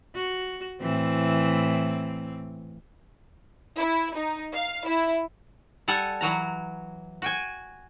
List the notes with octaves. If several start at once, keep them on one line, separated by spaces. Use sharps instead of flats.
F#4
A2 E3 C4
E4
D#4
F5
E4
G3 A4 F#5 G#5
E3 F#3 F#4 A#5
F#4 G5 G#5